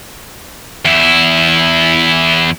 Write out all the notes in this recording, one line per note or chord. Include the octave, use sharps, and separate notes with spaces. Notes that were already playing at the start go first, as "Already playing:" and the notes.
E2 E4